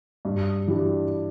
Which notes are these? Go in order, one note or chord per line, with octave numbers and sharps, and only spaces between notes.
G2
E3 G3 D4